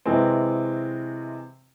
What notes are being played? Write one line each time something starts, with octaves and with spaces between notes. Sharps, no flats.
C3 E3 G#3 C4